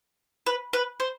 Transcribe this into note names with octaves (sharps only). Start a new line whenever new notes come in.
B4
B4
C5